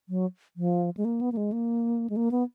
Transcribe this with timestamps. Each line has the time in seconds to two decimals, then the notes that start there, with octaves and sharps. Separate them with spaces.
0.09 F#3
0.57 F3
0.97 G#3
1.05 A#3
1.21 B3
1.32 A#3
1.37 G#3
1.52 A#3
2.10 G#3
2.16 A#3
2.31 B3